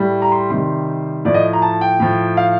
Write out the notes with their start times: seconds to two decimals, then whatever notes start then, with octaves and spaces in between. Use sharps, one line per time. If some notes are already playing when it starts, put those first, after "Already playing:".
Already playing: A2 G3
0.22 A#5
0.32 C6
0.50 C3 D#3 G3 C6
1.25 A2 F3 D5
1.34 D#5
1.53 A#5
1.62 A5
1.81 G5
2.00 A2 F3
2.37 F5